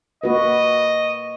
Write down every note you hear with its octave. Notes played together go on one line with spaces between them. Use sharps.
A#3 F#4 B4 D#5